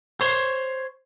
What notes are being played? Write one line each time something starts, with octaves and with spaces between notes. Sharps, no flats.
C5 C#5 C6